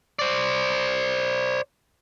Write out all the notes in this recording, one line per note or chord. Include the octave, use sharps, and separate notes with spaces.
C5 D5